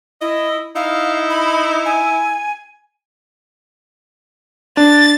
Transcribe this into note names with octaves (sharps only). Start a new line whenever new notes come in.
E4 D#5
D#4 E4 F5
B5
G#5
D4 A6